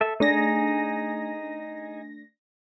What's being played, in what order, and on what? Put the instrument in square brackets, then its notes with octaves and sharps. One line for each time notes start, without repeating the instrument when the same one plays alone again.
[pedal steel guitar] A4 E5
[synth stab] A3 D4 A#6 [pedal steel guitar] D#4 G#4